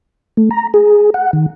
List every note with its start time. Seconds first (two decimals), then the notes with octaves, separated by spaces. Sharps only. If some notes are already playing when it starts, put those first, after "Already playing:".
0.37 A3
0.51 A#5
0.74 G#4
1.14 F#5
1.33 D#3